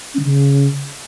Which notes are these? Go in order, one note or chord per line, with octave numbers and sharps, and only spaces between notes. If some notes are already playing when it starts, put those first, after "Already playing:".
C#4
D3
C#3